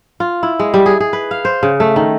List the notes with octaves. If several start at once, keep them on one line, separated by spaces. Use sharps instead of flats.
F4
E4
G#3
G3
G#4
G#4
B4
F5
C5
C#3
A3
D#3